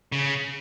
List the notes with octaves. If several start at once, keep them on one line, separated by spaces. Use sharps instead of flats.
C#3